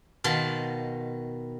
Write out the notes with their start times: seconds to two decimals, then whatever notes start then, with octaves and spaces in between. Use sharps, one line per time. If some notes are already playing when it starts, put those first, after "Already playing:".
0.24 B2 D#3 F5 A5 C6